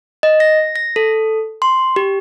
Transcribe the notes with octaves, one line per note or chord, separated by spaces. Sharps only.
D#5
A#6
A#6
A4
C6
G4